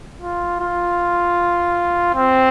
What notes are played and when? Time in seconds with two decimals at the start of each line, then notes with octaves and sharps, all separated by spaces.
0.22 F4
0.60 F4
2.15 C4